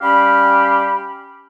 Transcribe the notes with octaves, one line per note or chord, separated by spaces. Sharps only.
G3 C#4 G4 F5 B5